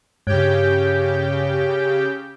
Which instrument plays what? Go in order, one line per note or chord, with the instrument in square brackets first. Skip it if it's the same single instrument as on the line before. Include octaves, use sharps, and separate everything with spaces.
[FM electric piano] G2 [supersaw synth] C#3 G4 G5 [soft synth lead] C#5